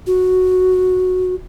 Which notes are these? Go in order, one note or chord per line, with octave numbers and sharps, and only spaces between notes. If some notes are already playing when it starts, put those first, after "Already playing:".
F#4